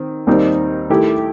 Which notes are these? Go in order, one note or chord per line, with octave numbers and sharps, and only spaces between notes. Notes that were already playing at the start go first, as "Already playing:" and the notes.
Already playing: D#3 C4
D#2 D#3 G3 C4 D#4
D#3 A3 E4 G4